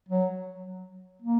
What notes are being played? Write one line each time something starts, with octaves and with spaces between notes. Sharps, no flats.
F#3
A#3